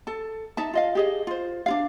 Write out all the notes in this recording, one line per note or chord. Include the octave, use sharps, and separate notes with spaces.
A4 A5
D#4 E5 A5
F4 D#5 F5
G4 G#4 D#5
F4 C5
D4 F4 F5